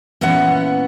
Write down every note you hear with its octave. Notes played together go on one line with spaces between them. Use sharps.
A#2 E3 B3 C#4 F#5